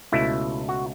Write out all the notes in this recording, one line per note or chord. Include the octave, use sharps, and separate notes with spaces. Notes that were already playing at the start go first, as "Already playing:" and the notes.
C#2 B2 A3 E4
F#4